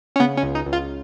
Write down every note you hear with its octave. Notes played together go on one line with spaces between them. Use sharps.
C#4
C#3 B3
C#4
C#2
D#4
C#2
F4